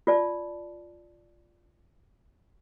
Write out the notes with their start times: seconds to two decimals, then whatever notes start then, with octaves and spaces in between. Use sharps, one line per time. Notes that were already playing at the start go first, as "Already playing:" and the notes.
0.07 F4 D5 A5